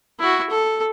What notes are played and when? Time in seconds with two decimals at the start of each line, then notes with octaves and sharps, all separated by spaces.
0.19 E4 F#4
0.50 A4